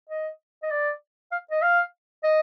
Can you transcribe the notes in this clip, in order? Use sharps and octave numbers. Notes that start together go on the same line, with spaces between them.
D#5
D#5
D5
F5
D#5
F5
D#5